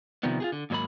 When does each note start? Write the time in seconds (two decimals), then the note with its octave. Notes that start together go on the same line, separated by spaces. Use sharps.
0.23 C3 D#3 F3 G3 B3
0.40 F4 G4 G#4
0.52 D3
0.70 D#2 G#2 F#3 G#3 A#3 B5